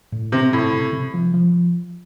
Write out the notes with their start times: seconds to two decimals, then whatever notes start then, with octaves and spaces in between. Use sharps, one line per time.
0.12 A2
0.32 C3 C4
0.52 A2 C4
0.73 C3
0.93 C3
1.14 F3
1.34 F3